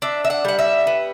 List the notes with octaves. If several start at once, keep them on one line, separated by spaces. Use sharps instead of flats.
D4 E5
E5
F#5
G3 F#5
E5
B3